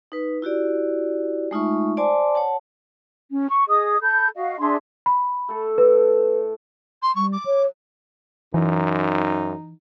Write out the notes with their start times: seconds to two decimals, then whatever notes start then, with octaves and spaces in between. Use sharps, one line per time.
0.12 D#4 B4
0.42 E4 F#4 G4 D5
1.51 G#3 A3 D#4 F4 E5 C#6
1.97 C5 D5 G#5 A5 C6 D6
2.35 C#5 F#5 A5
3.30 C#4
3.49 C#6
3.68 G#4 D#5 D#6
4.01 A4 B5 G6
4.36 F#4 D#5 F5
4.59 D4 G#4 E5 C6
5.06 B5
5.48 A3 A4
5.78 A2 B4
7.03 C6
7.16 G3 C#6
7.33 D6
7.46 C#5
8.54 F#2 E3 D#4